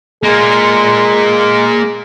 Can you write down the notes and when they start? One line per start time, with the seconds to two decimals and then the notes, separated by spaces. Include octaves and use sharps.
0.23 G#3 A#3 F4 G#4